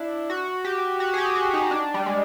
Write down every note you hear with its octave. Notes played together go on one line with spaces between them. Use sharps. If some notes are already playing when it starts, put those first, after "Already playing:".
Already playing: D4 E4
F#4
G4
F#4
G#4
G4
F#4
D#4
D4
G3
G#3